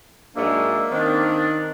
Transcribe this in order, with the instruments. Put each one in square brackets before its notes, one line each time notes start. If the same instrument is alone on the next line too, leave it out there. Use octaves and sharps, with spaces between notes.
[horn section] G#2 F#3 G#3 [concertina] A#3 [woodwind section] D4 E5
[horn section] D#3 [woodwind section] C4 D4